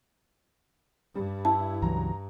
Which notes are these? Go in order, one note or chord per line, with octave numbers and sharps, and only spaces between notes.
G2 G3
E4 A5
C#2 E3 F#3 A#5